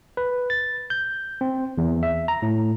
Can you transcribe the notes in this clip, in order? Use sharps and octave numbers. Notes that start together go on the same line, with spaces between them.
B4
A6
G6
C4
E2
E5
A#5
A2